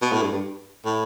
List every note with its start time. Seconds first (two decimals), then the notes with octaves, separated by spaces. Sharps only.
0.02 B2
0.12 A2
0.22 G2
0.32 G2
0.85 A2